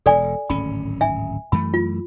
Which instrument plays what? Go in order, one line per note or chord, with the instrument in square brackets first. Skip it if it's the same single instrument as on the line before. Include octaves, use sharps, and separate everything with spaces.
[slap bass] E1 [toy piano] A4 D5 G#5
[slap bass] D1 G#1 C#4 [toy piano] B5
[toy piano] E5 G#5
[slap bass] F#2 E3 A3 [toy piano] B5
[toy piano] F4